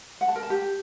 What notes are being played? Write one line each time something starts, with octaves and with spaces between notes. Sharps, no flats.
F#5
A5
A#4
A5
G4